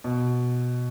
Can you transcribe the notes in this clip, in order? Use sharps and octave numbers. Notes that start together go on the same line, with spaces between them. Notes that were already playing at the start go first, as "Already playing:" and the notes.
B2